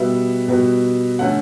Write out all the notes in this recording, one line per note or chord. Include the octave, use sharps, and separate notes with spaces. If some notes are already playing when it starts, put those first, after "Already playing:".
Already playing: B2 G3 B3 E5
B2 G3 B3
D3 A3 C#4 F#5